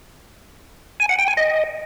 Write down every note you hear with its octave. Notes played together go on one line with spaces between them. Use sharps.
G#5
F#5
G5
G#5
D#5